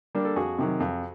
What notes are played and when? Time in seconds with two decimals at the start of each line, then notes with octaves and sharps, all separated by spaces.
0.15 G3 A#3 D4
0.25 A4
0.36 F2 F#4 G#4
0.59 C3 D#3 F#3
0.80 F2